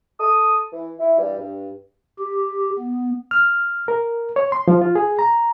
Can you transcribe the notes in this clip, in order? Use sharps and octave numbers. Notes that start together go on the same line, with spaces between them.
A4 D#6
E3
E4
G2 E3 G3
G2
G4
B3
F6
A#4
C#5
C6
F3
F4
G#4
A#5